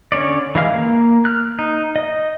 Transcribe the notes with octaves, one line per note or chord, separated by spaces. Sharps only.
D3 C#4 C#5 D5
E3 G#3 F5 F6
A#3
F6 F#6
D#4
D#5